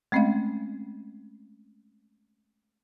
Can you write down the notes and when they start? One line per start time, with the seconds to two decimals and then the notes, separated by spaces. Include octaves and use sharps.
0.12 G#3 A3 C4 C#4 D#5 F5